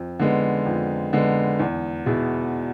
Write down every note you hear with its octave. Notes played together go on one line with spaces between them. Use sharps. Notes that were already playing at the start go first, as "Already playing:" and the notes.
Already playing: F2
D3 G#3 B3
F2
D3 G#3 B3
E2
B2 B3 E4 G#4